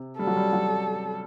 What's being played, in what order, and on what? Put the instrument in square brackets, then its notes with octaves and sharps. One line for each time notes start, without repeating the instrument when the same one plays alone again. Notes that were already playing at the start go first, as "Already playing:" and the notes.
Already playing: [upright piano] C3
[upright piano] G3 [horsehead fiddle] A4
[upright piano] F#3
G3
F#3